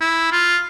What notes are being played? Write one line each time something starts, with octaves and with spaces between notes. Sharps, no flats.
E4
F4